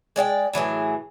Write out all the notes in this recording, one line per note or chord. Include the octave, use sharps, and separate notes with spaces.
G#3 D5 F#5 G5
A2 E3 F#3 G#4